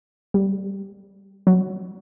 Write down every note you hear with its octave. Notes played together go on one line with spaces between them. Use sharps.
G3
F#3